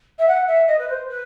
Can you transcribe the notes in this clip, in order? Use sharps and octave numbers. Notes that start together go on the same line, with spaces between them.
E5
F#5
E5
D#5
B4
C5
B4